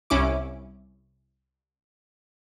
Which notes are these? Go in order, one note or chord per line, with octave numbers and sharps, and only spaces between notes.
C2 C#4 E4 D6